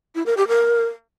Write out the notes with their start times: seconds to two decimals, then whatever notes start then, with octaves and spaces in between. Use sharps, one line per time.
0.15 E4
0.26 A#4
0.37 G4
0.48 A#4